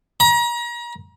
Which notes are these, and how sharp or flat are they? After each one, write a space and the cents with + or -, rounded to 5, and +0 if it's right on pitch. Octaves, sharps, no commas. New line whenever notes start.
A#5 +35